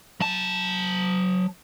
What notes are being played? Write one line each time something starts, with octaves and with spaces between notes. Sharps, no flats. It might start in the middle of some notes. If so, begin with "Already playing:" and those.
F#3 A5